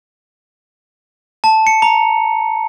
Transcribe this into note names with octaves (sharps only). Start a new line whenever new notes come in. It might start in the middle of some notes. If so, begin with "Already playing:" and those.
A5
C#7
A#5